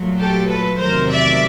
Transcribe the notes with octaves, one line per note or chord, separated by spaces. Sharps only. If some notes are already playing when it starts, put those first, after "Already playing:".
Already playing: A#2 F#3 A3
G4 A4
A4 B4
E2 C3 D#3 F#3 A3 A#4 C5
D5 E5